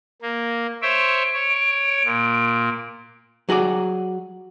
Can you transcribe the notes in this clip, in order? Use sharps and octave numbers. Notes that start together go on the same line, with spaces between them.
A#3
C5 C#5 E5 D7
C#5
A#2
F#3 F#4 G#4 D5